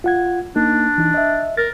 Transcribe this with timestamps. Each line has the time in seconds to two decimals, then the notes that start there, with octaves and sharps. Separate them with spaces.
0.04 F4 F#5 G#6
0.56 A#3 D4 D#4
0.98 E3 D#4
1.14 D#5 E5
1.57 A#4 A6